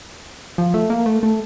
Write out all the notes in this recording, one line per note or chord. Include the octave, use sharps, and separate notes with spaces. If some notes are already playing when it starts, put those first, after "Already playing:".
F3
A3
A#3
A3
A3